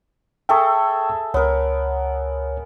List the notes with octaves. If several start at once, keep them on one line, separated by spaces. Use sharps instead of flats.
G#4 A4 E5 G5 C#6
C#2 B3 A#4 C#5